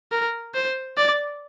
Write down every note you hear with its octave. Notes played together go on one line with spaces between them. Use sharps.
A#4
C5
D5